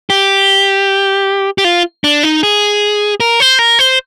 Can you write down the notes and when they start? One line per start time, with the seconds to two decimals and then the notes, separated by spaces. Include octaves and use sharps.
0.10 G4
1.58 G4
1.64 F4
2.04 D4
2.23 D#4
2.43 G#4
3.20 A#4
3.40 C5
3.59 A#4
3.79 C5